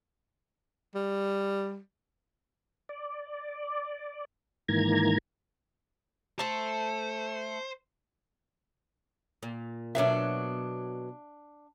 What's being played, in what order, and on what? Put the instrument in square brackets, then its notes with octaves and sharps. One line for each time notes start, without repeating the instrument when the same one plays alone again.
[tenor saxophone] G3
[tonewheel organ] D5
G#2 D#3 E3 A#3 A#5 G#6
[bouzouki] A3 A5 [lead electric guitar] C5
[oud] A#2
[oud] B2 F#3 A#3 [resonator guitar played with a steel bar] D4 E5